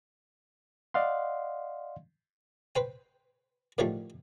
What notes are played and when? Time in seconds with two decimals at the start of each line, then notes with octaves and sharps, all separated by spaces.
0.94 D5 D#5 F5 F#5 C6
2.76 B4 C5 G5
3.78 A2 D3 D#3 F3 G3 A3